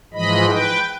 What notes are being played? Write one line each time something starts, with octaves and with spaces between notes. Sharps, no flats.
G#2 E3 F3 G#3 D#5 B5
B4 G5